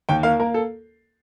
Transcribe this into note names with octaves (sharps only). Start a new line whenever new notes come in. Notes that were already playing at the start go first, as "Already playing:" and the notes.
D#2 G5
A#3 F5
A#3 A#4
A4